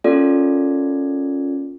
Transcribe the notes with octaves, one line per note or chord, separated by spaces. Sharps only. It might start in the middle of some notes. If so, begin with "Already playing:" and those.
A#3 C#4 F4 A4 D5